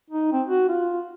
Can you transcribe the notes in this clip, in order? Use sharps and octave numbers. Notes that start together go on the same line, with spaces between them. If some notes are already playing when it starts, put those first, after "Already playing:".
D#4
C4
F#4
F4